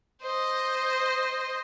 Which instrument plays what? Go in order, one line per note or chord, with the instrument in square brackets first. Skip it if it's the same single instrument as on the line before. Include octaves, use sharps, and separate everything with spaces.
[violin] C5 D#5